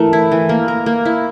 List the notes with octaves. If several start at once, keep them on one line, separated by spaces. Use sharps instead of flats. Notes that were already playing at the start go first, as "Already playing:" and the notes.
Already playing: E3 A3 A#4
E4
E3
A#3
A#4
A#3
E4